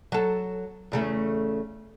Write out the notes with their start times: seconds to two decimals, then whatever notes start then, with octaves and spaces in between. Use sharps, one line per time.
0.12 F#3 A4
0.92 E2 C#3 A3